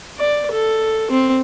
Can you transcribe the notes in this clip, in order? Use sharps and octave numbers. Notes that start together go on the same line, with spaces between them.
D5
A4
C4